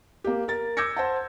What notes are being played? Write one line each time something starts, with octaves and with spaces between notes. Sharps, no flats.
A#3 G4
A#4 A6
D6 E6 G6 G#6 A#6 C#7
C5 F#5 A5